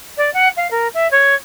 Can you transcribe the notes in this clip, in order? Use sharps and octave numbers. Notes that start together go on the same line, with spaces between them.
D5
F#5
F5
A#4
E5
C#5